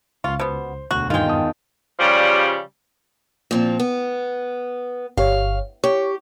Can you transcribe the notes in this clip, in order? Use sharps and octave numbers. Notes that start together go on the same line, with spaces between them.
C#2 F4 F5 C#6
B2 B3 C5
E1 D2 F#4 F#6
G2 D#3 G#3 F4 G5
E2 A5 D#6
C#3 F3 G3
A#2 F3 C4
B3
G1 G4 C#5 F5
G4 C#5 C#6